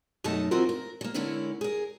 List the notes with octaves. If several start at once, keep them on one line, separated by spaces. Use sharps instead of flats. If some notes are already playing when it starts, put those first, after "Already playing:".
F#2 B2 A3 D#4 D#5 A5
E3 A#3 C4 F4 F#4 A#4
A#4
F#3 A#3
D3 G#3 C#4 E4 A#4
G#4 A#4